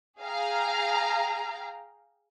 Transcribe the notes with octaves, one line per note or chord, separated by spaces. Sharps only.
G#4 F5 G5 A#5